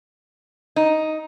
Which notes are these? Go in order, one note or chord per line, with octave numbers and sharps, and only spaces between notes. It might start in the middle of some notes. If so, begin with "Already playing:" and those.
D#4